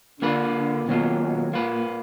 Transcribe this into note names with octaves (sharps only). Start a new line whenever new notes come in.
D3 A#3 F4 B4
D3
B2 D#3 F#3 A#3 F4
B2
A#2 A#3 F4 B4